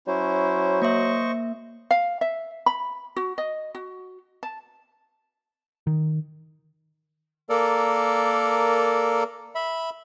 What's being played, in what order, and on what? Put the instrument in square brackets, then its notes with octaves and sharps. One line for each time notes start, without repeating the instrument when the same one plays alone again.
[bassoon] F#3 [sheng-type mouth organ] C#4 E4 C5
[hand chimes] A#3 E5 [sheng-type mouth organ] C5 D#5 C#6
[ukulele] F5
E5
B5
F#4
D#5
F#4
A5
[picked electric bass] D#3
[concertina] A#3 A4 A#4 D5
E5 B5